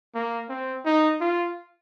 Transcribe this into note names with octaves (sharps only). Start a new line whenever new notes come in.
A#3
C4
D#4
F4